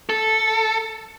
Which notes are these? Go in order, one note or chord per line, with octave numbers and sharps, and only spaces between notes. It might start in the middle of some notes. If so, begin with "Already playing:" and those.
A4